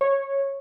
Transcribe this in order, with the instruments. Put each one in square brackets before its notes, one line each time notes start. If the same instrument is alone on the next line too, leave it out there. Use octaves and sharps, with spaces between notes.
[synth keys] C#5